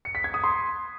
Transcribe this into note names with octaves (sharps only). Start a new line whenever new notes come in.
C#7
B6
G#6
D#6
C6